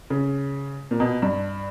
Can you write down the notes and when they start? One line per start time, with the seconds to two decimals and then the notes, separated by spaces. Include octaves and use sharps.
0.10 C#3
0.91 A#2
1.00 B2
1.22 G2